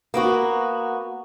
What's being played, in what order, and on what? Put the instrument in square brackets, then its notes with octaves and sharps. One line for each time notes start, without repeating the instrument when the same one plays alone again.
[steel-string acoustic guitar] A#3 B3 F#4